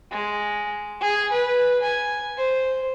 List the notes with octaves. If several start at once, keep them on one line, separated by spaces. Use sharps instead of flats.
G#3
G#4
B4
G#5
C5